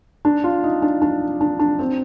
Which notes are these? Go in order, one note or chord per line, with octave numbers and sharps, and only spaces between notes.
D4
F4
D#4
D4
D4
D4
D4
C4